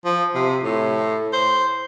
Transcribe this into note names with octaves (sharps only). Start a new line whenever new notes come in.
F3
C3
A2
C5